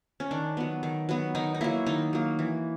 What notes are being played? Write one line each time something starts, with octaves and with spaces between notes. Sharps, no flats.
C#4
D#3 D4
F#3 B3
D#3
F#3 B3
D#3 D#4
D#4
F#3 A#3 E4
D#3 D#4
F#3 A#3
E3